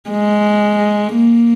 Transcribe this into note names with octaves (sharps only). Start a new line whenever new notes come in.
G#3
A#3